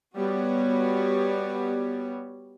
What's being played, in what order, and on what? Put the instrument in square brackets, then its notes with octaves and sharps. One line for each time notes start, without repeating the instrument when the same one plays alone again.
[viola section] G3 B3 F#4 C#5